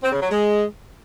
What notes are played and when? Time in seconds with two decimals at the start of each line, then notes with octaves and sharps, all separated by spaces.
0.03 C4
0.12 C#3
0.21 F#3
0.30 G#3